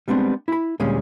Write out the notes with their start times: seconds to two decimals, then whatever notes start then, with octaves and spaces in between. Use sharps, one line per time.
0.08 G3 G#3 B3 C4 D4
0.48 E4 B5
0.80 D2 A#2 G3 G#3 C#4